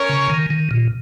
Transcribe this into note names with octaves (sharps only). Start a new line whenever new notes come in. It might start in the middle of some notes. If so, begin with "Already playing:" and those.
Already playing: C#4 A#4 C#5
C#3
D#3
D#3
A#2